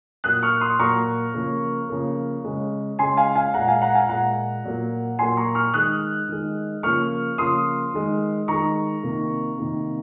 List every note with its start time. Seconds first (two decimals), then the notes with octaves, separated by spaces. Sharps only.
0.24 A#2 F#3 A#3 D#6 F#6
0.43 C#6 F6
0.61 C6 D#6
0.79 A#2 F#3 A#3 A#5 C#6
1.34 C#3 F3 A#3
1.89 C#3 F3 A#3
2.44 C#3 G#3
2.99 C#3 G#3 G#5 C6
3.17 F5 G#5
3.35 F5 G#5
3.54 A#2 G#3 F#5 A#5
3.68 F5 G#5
3.82 F#5 A#5
3.95 F5 G#5
4.09 A#2 G#3 F#5 A#5
4.64 A#2 F#3 A#3
5.19 A#2 F#3 A#3 G#5 C6
5.37 A#5 C#6
5.55 C#6 F6
5.73 D#3 G#3 D#6 F#6
6.29 D#3 G#3
6.83 C#3 F3 A#3 C#6 F6
7.38 C#3 F3 A#3 C6 D#6
7.94 D#3 G#3
8.48 D#3 G#3 A#5 C#6
9.03 C3 D#3 A#3
9.58 C3 D#3 A#3